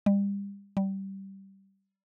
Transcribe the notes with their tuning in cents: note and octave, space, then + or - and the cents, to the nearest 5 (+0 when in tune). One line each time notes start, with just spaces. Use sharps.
G3 +35
G3 -15